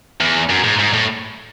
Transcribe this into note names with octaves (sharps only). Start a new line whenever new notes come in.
E2
F#2
G#2
G#2
A2